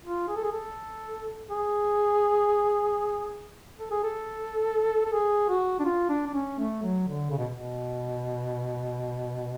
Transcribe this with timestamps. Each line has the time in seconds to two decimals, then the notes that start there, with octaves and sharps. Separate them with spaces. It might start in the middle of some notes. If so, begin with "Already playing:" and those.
0.05 F4
0.28 G#4
0.37 A4
0.44 G#4
0.53 A4
1.50 G#4
3.80 A4
3.91 G#4
4.04 A4
5.06 A4
5.13 G#4
5.49 F#4
5.80 D4
5.85 F4
6.10 D4
6.27 D4
6.34 C#4
6.59 A3
6.83 F#3
7.07 D3
7.31 C#3
7.38 B2
7.54 B2